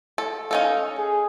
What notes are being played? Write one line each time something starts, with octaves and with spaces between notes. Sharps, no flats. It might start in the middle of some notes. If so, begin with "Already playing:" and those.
A4
C#4 D#4 A4 F5
G#4